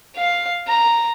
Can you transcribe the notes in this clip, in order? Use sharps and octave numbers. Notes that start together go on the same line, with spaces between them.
F5
A#5